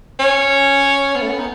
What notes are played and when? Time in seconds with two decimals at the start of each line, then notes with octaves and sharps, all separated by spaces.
0.19 C#4
1.15 B3
1.22 A3
1.30 B3
1.39 D#4